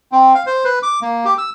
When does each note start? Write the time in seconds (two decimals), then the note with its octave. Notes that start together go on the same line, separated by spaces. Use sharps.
0.12 C4
0.35 F5
0.47 C5
0.65 B4
0.83 D6
1.02 A#3
1.25 G4
1.38 E6